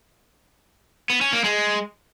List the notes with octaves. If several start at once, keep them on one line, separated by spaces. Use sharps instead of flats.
B3
C#4
A#3
G#3